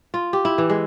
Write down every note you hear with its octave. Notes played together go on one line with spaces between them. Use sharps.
F4
G4
E4
E3
G#3